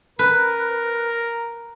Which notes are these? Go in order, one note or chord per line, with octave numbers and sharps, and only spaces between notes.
A#4 B4